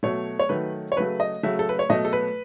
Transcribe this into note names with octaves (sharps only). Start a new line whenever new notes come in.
B2 F#3 A3 C#5
C#5
D#3 F#3 A3 B4
C#5
C#3 F#3 A3 B4
D#5
C#3 F#3 A3 E5
A4
B4
C#5
B2 F#3 A3 D#5
A4
B4